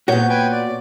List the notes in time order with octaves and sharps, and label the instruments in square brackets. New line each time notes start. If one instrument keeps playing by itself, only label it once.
[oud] A#2 B3 [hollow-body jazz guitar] F#4 C#5 [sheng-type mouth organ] G6
[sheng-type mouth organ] B4 G5 G#5
D5